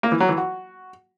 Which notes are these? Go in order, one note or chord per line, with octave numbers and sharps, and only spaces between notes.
A#3
E3
F#3
E3
F#4